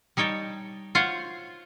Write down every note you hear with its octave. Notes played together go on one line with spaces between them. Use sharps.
G3 D#4 C#5 G5 A5
F4 F#4 C5 C#5